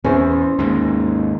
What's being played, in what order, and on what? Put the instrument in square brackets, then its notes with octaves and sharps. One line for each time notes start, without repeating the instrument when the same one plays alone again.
[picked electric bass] E2 [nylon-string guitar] C#4 C5
[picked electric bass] D#2 G#2